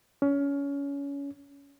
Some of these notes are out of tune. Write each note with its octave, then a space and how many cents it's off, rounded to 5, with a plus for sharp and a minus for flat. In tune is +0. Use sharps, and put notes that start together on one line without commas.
C#4 +25